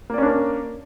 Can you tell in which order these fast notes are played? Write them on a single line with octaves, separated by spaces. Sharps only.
A#3 D5 C#4 D4 A#4